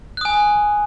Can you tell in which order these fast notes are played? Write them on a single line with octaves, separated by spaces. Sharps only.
F#6 D#6 G#5